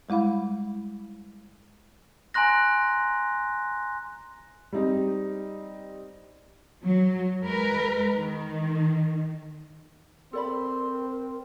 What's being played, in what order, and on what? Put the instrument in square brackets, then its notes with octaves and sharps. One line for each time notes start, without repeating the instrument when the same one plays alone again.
[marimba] G3 G#3 E4 F5 B5
[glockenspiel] G#5 A#5 C6 F#6 A#6
[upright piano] G3 C4 D#4
[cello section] F#3
G#3 A#4 B4
D#3
[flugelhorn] C4 [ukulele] A4 D5 B5 [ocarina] A#4 [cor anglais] C5